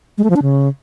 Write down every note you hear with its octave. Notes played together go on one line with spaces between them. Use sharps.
G#3
A3
F3
D4
C#3